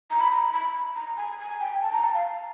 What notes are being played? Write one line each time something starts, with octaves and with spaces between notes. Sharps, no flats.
A#5
B5
A#5
B5
B5
A#5
G#5
G#5
G5
A5
A#5
A5
F5